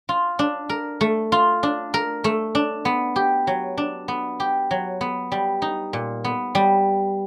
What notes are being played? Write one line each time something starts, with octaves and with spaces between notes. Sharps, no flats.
F4
D4
A#4
A3
F4
D4
A#4
A3
D4
B3
G4
F#3
D4
B3
G4
F#3
B3
G3
D#4
A#2
B3
G3